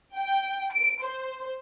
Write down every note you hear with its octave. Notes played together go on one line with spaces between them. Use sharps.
G5
D7
C5